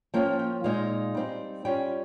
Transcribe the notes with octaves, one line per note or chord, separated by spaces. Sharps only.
F3 A#3 C#4 F4 G5
G5
A#2 G#3 D#4 F5
G3 C4 D#4
G3 C#4 F4 G5